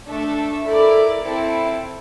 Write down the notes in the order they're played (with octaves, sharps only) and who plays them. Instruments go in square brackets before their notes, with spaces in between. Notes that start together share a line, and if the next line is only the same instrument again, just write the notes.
[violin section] A3 D4 A4 E5
[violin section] E4 A#4 D5 [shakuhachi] A4
[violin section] C4 E4 A4